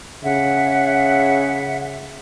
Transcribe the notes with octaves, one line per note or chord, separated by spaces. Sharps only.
C#3 E5 F#5